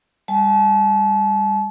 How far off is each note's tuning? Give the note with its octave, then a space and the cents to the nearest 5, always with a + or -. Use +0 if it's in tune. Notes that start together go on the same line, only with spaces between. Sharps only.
G3 +25 A5 -35